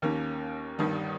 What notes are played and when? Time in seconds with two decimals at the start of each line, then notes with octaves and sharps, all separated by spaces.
0.02 D#2 D#3 A#3 C#4
0.78 G1 G2 D#3 G3